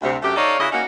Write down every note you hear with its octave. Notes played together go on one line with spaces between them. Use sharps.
D2 C3
F#2 A3 G4
D#4 A4 C#5 D5 F5
C#3 E4 F#4 D#5
A#3 C#4 D#4 F#4